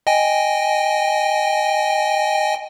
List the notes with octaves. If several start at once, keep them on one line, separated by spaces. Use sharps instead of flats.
D#5 G5 G#5